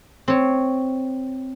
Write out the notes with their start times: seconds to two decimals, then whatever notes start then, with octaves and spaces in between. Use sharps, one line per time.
0.28 C4 C#5